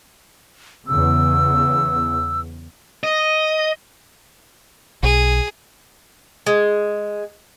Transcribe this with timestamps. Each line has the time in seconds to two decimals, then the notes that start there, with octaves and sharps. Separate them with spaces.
0.88 E2 C#3 E6
3.04 D#5
5.03 B1 G#4
6.47 G#3